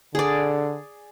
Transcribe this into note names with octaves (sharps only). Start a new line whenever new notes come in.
D3 G#4 D5